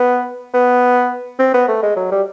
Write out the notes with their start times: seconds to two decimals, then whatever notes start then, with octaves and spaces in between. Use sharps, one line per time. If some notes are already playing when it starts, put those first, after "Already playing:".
Already playing: B3
0.54 B3
1.39 C4
1.54 B3
1.68 A3
1.83 G#3
1.96 F#3
2.12 G3